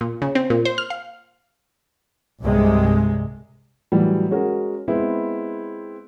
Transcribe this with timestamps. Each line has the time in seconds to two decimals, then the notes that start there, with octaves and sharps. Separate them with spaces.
0.01 A#2
0.22 C#3
0.35 C4
0.50 A#2
0.65 C5
0.78 F6
0.90 F5
2.42 C2 G2 C3 G#3
3.92 A2 E3 F#3 G3
4.31 G#3 C#4 F#4 G#4 A#4
4.88 G#3 B3 C4 E4